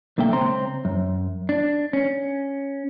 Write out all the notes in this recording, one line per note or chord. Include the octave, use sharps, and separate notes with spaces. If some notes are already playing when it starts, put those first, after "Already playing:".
B1 D3 A#3 E5 G5
C#2 C4 A#5 C6
F#2
D4
C#4